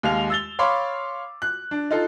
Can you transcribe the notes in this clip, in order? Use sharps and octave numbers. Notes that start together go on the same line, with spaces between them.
D#2 G#3 F5 F7
E6 A6 G7
C#5 F5 B5 C6 D6
F#6
D4
D#4 F4 A4